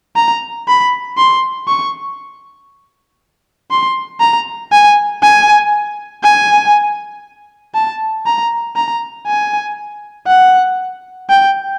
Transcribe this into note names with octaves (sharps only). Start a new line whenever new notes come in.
A#5
B5
C6
C#6
C6
A#5
G#5
G#5
G#5
A5
A#5
A#5
G#5
F#5
G5